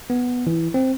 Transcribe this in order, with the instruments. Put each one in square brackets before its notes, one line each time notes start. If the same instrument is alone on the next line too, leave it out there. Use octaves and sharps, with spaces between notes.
[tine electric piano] B3
E3
C4